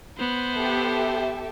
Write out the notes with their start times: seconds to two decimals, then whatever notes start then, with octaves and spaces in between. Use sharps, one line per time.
0.18 B3 C5
0.56 G4 A4 E5